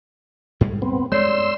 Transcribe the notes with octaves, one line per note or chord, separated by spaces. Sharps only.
G#2 G3 G#3
B3 C4
G2 G#3 C#5 D5 C6 E6 C7